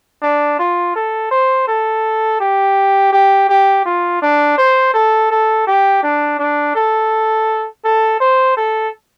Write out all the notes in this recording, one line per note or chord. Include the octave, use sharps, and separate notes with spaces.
D4
F4
A4
C5
A4
G4
G4
G4
F4
D4
C5
A4
A4
G4
D4
D4
A4
A4
C5
A4